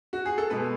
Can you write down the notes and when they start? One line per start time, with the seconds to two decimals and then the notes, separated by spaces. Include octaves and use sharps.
0.13 F#4
0.26 G#4
0.38 A4
0.50 B2 G#3 B3 B4